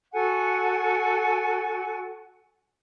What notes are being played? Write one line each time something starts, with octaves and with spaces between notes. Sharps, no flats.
F#4 A4 F#5 G#5